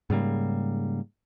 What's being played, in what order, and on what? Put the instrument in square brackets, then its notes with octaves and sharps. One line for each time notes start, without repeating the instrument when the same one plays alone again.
[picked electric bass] G#2 C#3 G3 A#3